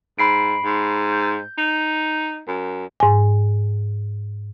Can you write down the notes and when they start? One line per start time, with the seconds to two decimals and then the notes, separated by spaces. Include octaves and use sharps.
0.19 G#2 B5 C7 D7
0.64 G#2
1.12 G6
1.58 D#4
2.48 F#2
3.00 G#2 G#5